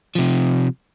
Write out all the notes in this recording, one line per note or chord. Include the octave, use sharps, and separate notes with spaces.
C3 F3